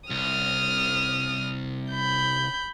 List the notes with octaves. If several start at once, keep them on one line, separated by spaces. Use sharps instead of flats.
C2 D#6 F6
B5 G6